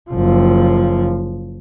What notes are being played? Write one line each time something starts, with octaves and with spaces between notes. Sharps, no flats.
F#1 F3